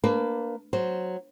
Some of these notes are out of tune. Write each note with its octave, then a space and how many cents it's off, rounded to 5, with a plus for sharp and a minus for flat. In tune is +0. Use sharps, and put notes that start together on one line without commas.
A#3 +0 D4 -5 B4 +25
F#3 +0 C5 +0